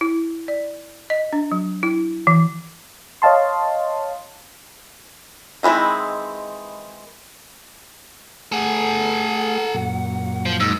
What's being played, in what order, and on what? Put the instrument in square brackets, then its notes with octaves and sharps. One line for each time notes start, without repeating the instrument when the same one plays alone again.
[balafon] E4
D5
D#5
D4
F#3
E4
E3
[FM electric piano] C#5 D#5 F5 A5 C6
[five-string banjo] D#3 E3 G#3 C4 E4
[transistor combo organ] A3 G#4 [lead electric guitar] A4 G#5 [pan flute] F#5
[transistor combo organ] F#2 A#2
[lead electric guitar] F3
[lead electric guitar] G#2 [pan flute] E6